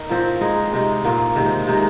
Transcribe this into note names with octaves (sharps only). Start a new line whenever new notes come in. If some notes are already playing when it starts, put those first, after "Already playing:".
Already playing: D#4 A#4
A#2 F3 C4
G#3 D#4 G#4
C3 G#3 D#4
A#2 A#3 F4
C3 D#3 G#3 C4
C3 G#3 D#4